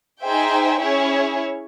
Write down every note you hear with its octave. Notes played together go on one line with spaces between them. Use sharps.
D#4 G#4 C5 E5 G5
C#4 E4 G#4 C#5